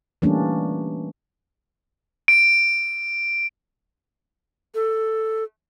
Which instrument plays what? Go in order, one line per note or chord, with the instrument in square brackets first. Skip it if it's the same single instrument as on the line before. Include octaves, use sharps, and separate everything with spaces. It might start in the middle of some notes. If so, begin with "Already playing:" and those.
[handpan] E3 G3 A3 A#3 C#4 D4
[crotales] D7
[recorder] A4